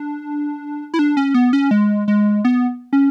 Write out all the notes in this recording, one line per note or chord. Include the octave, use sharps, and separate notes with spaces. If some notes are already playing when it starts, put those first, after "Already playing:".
Already playing: D4
E4
D4
C#4
B3
C#4
G#3
G#3
B3
C#4